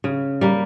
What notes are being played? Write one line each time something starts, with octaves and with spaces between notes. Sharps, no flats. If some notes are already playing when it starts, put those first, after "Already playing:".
C#3
G3 A#3